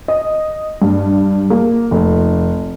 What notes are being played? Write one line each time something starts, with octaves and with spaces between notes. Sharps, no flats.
D#5
G2
A#3
F1